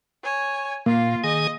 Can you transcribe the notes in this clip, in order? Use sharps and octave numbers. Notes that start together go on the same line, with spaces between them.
C#5 G#5
A#2 A#3 F4 F5
D#3 G#4 D#5 G#5